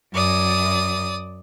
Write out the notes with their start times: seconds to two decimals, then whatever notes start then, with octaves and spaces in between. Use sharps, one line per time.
0.14 F#2 D5 D#6